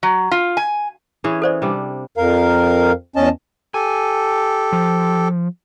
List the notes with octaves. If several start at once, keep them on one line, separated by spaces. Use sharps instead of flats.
F#3
F4
G#5
E3 C#4 G#4
A4 C5 D5
C3 G3 D4
F2 A#4 F5
E2 C#4 D#5 A5
G4 A4 G#5
F3